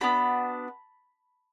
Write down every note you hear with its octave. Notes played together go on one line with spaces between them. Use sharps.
B3 D4 F#4 B5